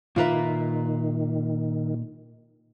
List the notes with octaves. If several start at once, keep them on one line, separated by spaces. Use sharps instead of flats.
A#2 D#3 F4 B4 E5 F5 A#5